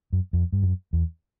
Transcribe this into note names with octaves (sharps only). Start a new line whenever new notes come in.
F#2
F2
G2
F#2
E2